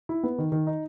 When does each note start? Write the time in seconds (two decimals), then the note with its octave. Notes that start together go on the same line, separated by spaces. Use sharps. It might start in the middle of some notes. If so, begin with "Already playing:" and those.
0.09 E4
0.23 B3
0.38 D#3
0.52 D#3
0.67 D#4